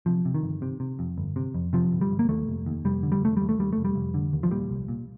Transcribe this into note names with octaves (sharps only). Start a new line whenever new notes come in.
C3 F3
C3
D#3
G1
C3
C3
F2
G1
C3
F2
C3 F3
G1
G3
G1
A#3
D#2 A3
F1
D#2
F1 G3
D3
G3
F1 A3
D#2 G3
A3
D#2 G3
A3
F1
G3
F1
D3
D#2
F3
A#2 G3
C2
A#2